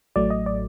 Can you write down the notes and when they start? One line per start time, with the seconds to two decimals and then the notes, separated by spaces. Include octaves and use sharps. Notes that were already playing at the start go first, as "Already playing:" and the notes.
0.16 A1 A2 F#3 A3 D5
0.30 D#5
0.46 D5